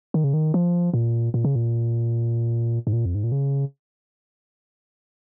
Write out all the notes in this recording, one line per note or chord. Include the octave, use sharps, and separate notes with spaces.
D#3
C#3
D#3
F3
A#2
A#2
C#3
A#2
G#2
A#2
F2
G#2
A#2
C#3